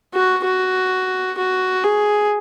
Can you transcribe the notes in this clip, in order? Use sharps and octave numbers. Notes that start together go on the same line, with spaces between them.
F#4
F#4
F#4
G#4